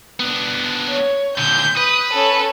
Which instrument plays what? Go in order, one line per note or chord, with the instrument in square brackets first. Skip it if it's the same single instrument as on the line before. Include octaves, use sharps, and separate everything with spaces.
[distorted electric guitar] B3 D4
[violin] C#5
[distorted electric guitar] A#2 D3 [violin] G6
[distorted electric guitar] B4 [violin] D#6
[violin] C#4 A4